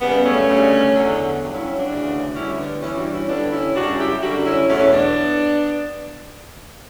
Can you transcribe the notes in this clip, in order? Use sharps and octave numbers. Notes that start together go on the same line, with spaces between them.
F#2 C#3 G3 B3
A3 C#4
D2 C#3 G3
E2 D3 F#3
G2 F#3
C#4 E4
C#4 E4
D4 F#4
D2 C#3 E3
D2 D3 G3 C#4 E4
B3 D4
G2 E3 G3 C#4 E4
D4 F#4
C#4 E4
G2 D3 G3 B3 D4
C#4 E4
F#2 C#3 G3 D4 F#4
E4 G4
F#2 D3 G3 D4 F#4
C#4 E4
E2 B2 F#3 A3 C#4
B3 D4